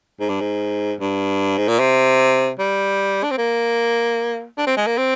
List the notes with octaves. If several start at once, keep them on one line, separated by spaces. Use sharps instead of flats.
G#2
G2
G#2
G2
G#2
A#2
C3
G3
D4
C4
A#3
D4
C4
G#3
A#3
C4